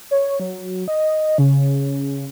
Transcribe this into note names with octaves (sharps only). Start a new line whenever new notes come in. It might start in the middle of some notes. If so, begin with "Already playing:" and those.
C#5
F#3
D#5
C#3